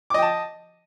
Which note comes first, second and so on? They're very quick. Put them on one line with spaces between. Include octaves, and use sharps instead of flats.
D6 D#5 G5 A5